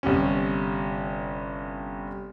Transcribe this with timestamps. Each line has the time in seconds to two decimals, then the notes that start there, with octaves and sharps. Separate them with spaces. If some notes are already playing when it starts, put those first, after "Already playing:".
0.03 G1 C3 C#4